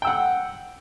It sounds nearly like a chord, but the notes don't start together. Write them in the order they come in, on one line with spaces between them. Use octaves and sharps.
G5 E6 F#5